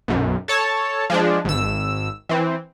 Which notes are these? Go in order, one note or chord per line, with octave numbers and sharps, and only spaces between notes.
B1 F#2
A4 C#5 A5
F3 G#3 D4
G#1 E6
E3 C4